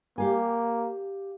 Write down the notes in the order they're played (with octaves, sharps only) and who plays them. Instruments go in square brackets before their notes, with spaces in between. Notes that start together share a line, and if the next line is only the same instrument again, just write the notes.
[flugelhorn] A#3 [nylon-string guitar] G4 F5 G#5